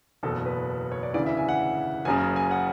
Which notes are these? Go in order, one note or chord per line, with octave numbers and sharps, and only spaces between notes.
F#1 E2 B2 A4
B4
C#5
D5
D2 C#3 E3 D5
E5
G#5
F#5
F#1 F#2 C#3 G#5
G#5
F#5